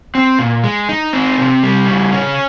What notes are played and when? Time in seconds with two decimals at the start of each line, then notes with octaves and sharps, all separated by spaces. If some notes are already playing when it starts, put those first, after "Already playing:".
0.15 C4
0.39 A#2
0.64 G#3
0.89 D#4
1.13 C4
1.38 C3
1.63 G3
1.87 C#3
2.13 C#4